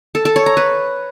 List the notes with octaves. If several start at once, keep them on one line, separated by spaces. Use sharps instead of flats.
A4
A4
C#5
A#5
B4